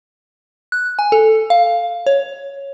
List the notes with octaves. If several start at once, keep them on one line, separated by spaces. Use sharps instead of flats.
F#6
G#5
A4
F5
C#5